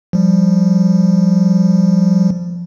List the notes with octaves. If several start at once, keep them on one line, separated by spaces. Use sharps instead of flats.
F3 G3